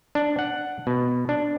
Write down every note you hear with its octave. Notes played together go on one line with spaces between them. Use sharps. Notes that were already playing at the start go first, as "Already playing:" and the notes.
D4
F#5
B2
D4